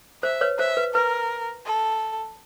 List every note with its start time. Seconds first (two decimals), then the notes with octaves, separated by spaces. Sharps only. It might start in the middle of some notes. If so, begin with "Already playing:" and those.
0.23 C5 E5
0.41 B4 C#5
0.59 C5 E5
0.77 B4
0.95 A#4 B4
1.66 A4